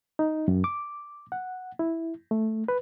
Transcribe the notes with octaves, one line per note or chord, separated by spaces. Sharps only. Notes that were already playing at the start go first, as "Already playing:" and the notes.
D#4
F#2
D6
F#5
E4
A3
B4